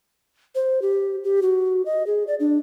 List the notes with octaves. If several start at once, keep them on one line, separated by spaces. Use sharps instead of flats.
C5
G4
G4
F#4
D#5
G#4
D5
D4